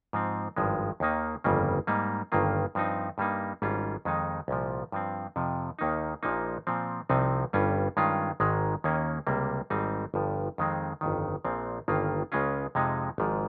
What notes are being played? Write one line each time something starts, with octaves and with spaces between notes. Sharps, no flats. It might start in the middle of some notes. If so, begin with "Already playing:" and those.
G#2 F3 C4
G#1 G2 F3 G#3
D#2 D#3 A#3 D#4
G1 F2 C#3 G3 A#3
G#2 G3 A#3 D#4
G1 G2 D#3 A#3 F4
G2 F3 C4 D#4
G2 G3 A#3 D#4
G#1 G#2 G3 C#4 F4
F2 D#3 G#3 D#4
C2 A#2 F3
G2 F3 C4
F2 C3 F3
D#2 D#3 A#3 D#4
A#1 A#2 F3 A#3 D#4
A#2 F3 C4
C2 C3 F3 C4 D#4
G1 G2 G3 C#4 F4
G2 D#3 G#3 C#4 F4
G#1 G#2 D#3 G#3
D#2 D#3 A#3 C#4
C#2 C3 G3 A#3
G#1 G#2 G3 C4 D#4
G1 G2 F3
F2 D#3 G#3 C4
G1 F2 D#3
A#1 A#2 F3 C4
G1 G2 D#3 A#3 F4
C#2 C#3 G#3 C#4 F4
F2 C3 F3 G#3 D#4
G#1 G#2 F3